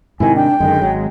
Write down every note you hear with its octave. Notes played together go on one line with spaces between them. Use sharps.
G#2 C3 D#3 E4 G#5
D4 G5
F#2 D3 D#3 G#3
G#1 F#3